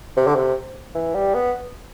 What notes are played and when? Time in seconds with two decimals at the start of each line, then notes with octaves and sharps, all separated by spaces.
0.17 C3
0.27 D3
0.35 C3
0.95 E3
1.14 G3
1.34 B3